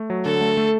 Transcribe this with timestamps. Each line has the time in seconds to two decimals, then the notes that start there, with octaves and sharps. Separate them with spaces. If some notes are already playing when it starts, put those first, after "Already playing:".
Already playing: A3
0.10 F#3
0.25 D3 A4
0.41 A3
0.57 A3